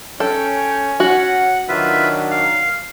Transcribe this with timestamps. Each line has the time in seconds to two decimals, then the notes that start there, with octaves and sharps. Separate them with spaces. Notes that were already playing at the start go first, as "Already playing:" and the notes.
0.20 C#4 A4 G5
1.00 F#4 F#5
1.69 D#3 F#3 D4 F4 B4 E5
2.31 F5